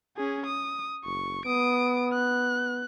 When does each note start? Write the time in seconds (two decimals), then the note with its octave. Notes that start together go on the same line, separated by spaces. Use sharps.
0.17 C#4 G#4
0.46 D#6
1.05 F#1 C#6
1.46 B3 D#6 D7
2.13 F#6